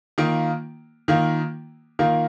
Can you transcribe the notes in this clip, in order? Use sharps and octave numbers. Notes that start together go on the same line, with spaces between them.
D#3 A#3 F4
D#3 A#3 F4
D#3 A#3 F4